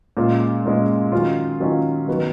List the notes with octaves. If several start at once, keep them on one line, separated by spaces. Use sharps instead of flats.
A#2 G#3 C#4 F4
A#2 G#3 C#4 F4
D#3 F#3 C#4 F4
D#3 F#3 C#4 F4
D#3 F#3 B3